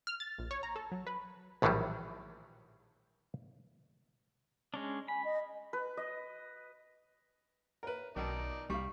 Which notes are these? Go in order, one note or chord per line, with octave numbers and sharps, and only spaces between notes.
F6
A6
A#1
C#5
A#5
A4
F#3
B4
A#1 A2 D#3 E3 F#3 G3
G#3 C#4 D4
G#5 B5
D#5
B4
D#5
A#4 B4 C#5 D5 E5
B1 B2 D#3 D#4 A#4 D5 G5 A5
C2 G3 F5 C#6